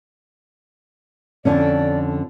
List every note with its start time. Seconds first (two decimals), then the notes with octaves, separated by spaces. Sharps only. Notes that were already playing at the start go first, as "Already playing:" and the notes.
1.45 F2 D3 C#4 D5